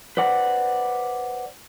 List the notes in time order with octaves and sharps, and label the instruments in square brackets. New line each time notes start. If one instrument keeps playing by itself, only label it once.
[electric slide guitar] B4 C5 D5 F#5